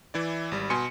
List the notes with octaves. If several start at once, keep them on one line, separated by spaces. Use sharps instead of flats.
E3 E4 D5
G#1 G3
B2 G#5 C6 C#7